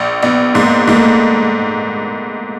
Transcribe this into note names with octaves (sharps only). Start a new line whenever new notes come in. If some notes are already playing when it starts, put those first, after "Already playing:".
Already playing: A#1
A#1 B3
G#2 A#3
G#2 A#3
A3
A#3